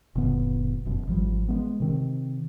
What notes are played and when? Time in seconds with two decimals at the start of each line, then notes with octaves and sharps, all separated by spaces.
0.15 F1 A2 C#3 B3
0.85 E1 F#2 B2
1.07 G#1 F3 G3
1.49 G#3 A3 B3
1.80 C3 D#3 C4